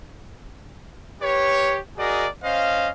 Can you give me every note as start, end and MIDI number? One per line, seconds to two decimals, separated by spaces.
1.22 1.78 67
1.22 1.78 71
1.22 1.78 73
1.98 2.27 66
1.98 2.27 68
1.98 2.27 70
1.98 2.27 74
1.98 2.27 75
2.44 2.89 61
2.44 2.89 72
2.44 2.89 75
2.44 2.89 77